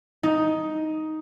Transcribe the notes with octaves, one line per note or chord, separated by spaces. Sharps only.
D#4